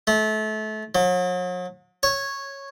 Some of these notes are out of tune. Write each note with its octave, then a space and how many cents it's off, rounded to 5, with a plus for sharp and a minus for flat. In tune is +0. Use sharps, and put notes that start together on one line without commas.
A3 -30
F#3 -40
C#5 -5